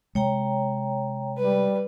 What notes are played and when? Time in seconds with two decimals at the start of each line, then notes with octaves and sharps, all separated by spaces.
0.15 C3 G#3 C#5 G5 A#5
1.38 G3 B4